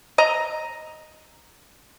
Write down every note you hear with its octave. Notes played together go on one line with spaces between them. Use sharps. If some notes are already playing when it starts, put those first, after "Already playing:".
D#5 A#5